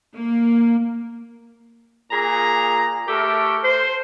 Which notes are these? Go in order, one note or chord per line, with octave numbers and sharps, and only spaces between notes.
A#3
A#2 G#4 A#5
A3 G4 A4 A#4
C5